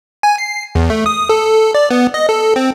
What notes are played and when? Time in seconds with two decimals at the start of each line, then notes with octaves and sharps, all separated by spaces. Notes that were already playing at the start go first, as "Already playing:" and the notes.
0.23 G#5
0.38 C7
0.75 E2
0.90 A3
1.06 D#6
1.29 A4
1.75 D5
1.90 B3
2.14 D#5
2.29 A4
2.56 C4